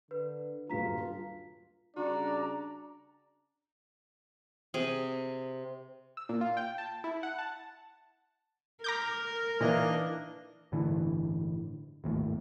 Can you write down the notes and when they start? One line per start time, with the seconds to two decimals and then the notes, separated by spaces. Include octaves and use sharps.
0.11 D3 B4
0.70 D#1 G2 F#3 F4 A#5 B6
1.97 C#3 G3 D4 F#4 D5 A#5
4.74 C3 G#4 G5
6.17 E6
6.29 A#2
6.41 F4
6.57 G5
6.78 A5
7.04 E4
7.23 F#5
7.38 A5
8.84 A#4 A#5 D6 G6
9.61 A#2 E3 A#3 D4 D#4 D#5
10.72 G1 A2 D3 E3
12.04 G#1 D#2 A2